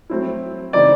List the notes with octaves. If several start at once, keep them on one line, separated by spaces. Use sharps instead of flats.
F#3 A3 C4 E4
C#3 E3 A3 C4 D#4 D5